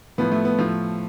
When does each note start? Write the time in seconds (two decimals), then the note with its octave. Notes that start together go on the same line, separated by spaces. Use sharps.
0.18 A2 F3 B3
0.32 A3
0.45 B3
0.59 A2 F3 A3